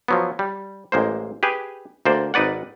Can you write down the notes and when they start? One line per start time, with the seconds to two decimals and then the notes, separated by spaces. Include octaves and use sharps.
0.08 F3 F#3 B3
0.39 G3
0.92 A1 G#3 A#3 C5
1.43 G4 G#4 B4
2.05 D2 A#3 C5 D5
2.34 G#1 D#4 B4 D5 F#5